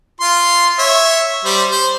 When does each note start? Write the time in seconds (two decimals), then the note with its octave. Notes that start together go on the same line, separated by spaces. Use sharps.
0.21 F4 C6
0.79 C#5 E5
1.45 G3 C5
1.72 C5